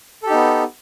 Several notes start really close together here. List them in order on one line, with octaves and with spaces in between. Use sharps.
A4 G4 D#4 B3